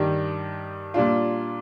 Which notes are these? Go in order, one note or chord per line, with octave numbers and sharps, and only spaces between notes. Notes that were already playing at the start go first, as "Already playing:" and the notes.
Already playing: G2 D#3 G3
A#2 G3 D4 F4